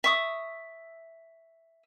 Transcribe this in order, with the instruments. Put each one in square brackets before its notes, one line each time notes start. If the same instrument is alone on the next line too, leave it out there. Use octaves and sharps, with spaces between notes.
[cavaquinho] E5 C#6 D#6